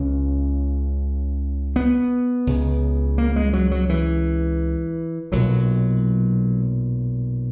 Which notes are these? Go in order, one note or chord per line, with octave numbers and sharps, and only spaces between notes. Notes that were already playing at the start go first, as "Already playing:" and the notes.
Already playing: C#2 C#3 C#4
B3
C#2 C#3
A#3
G#3
F#3
F#3
E3
B1 A#2 F#3